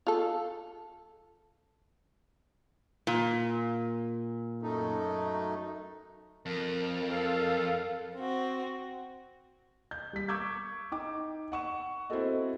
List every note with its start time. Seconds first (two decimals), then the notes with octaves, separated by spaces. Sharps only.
0.07 F4 A4
3.07 A#2
4.62 F#2 A3 D#4
6.46 F2 A#4
7.10 A4 F5
8.14 C4 F#4
9.91 G6
10.13 G3 B6
10.28 C#6 D6 E6 G6 G#6
10.92 D#4 G5 D6
11.52 F#5 C#6 E7
12.10 C4 E4 F#4 A4 D#5